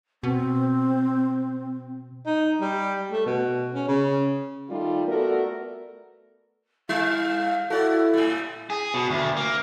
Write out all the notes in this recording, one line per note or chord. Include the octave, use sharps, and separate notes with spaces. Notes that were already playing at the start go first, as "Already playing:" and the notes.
B2 C4
D#4
G3
A3
B2
C#4
C#3
D#3 G3 A3 D#4 F4
A3 B3 F#4 A4 A#4 D5
G3 E4 F5
E4 F#4 A4 D5
A2 G3
G#4
B2
D2
A#3